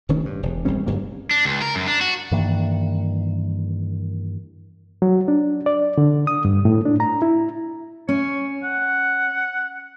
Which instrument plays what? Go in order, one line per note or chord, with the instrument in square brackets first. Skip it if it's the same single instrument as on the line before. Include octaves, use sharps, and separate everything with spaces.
[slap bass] D1 D2 D#3 C#4
G2
E1
G#1 G3 C4 C#4
G1 G2 F#3 A#3
[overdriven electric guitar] D4
C#2
A#4
F#2
D4
F#4
[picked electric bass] G2 D#3 E3 A#3
[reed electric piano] F#3
D4
D5
D3
D#6
G2
A2
D4
A#5
E4
[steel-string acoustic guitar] C#4 [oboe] C#5
[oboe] F#5